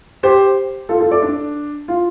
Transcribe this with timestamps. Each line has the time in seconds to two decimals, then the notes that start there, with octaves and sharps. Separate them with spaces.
0.23 G4 C5
0.89 F4 A4
1.00 F4 A4
1.11 A4 D5
1.22 D4
1.88 F4